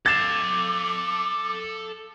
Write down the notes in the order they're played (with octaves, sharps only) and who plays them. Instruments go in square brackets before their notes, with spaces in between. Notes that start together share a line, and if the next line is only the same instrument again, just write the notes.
[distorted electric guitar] A4 F5 [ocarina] D6 [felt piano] A6 E7